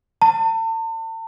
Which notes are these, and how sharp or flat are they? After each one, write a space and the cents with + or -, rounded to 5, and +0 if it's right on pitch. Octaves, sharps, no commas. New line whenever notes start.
A5 +40